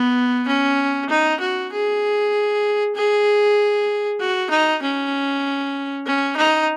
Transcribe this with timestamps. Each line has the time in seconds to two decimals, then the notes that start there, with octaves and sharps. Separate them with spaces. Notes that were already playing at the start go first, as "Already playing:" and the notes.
Already playing: B3
0.48 C#4
1.09 D#4
1.41 F#4
1.72 G#4
2.95 G#4
4.20 F#4
4.50 D#4
4.82 C#4
6.06 C#4
6.37 D#4